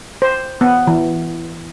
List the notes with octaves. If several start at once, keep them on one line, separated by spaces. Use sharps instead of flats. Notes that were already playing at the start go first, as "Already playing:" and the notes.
C5
B3
E3